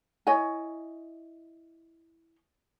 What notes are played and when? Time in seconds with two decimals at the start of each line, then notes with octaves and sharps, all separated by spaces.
0.27 E4 C#5 D#5 G#5